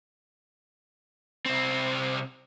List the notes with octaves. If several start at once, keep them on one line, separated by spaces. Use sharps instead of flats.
C2 C4